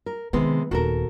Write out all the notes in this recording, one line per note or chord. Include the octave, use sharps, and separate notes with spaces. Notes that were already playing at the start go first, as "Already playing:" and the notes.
A#4
C3 D#3 G#3 B3
D#1 D#2 F#4 A4 A#4